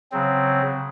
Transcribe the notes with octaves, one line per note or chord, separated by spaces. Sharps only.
C#3 F#3 C4